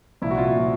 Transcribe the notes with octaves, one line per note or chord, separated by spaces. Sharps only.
C2 A#2 F3 E4
F#4
F4
A#2 F3